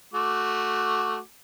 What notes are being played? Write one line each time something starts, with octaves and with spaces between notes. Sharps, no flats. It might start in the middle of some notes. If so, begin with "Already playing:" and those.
A3 F#4 D6